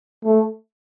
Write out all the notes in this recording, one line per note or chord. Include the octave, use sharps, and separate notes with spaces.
A3